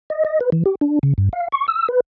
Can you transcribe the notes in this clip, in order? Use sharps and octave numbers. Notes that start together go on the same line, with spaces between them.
D#5
D#5
B4
E3
G4
D4
C#3
G2
F5
C#6
E6
B4